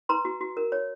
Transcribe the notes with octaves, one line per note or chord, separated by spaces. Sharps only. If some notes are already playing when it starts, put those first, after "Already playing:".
B4 A#5 C6
F#4
F#4
A#4
C#5